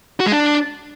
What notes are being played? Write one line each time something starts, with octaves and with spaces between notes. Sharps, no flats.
F#4
G#3
D4